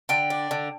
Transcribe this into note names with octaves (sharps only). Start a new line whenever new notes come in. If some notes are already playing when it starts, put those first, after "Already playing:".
D3 G5
D4
D3